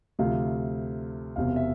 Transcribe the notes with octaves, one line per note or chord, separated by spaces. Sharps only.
D2 C3 F3 F5
E1 E2 C3 F5
E5